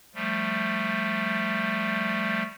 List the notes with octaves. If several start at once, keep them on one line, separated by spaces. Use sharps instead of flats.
F3 G3 A3